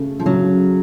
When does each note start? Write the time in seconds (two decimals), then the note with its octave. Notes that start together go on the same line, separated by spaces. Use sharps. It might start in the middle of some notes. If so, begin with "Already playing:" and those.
Already playing: C#3 A3
0.20 F3
0.26 C#3 F#3